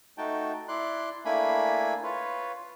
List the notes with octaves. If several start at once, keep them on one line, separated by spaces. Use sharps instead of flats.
A3 D#4 F#4 G5 A5
E4 D5 C6 F#6
A3 A#3 D4 E4 G#5 B5
F4 B4 C#5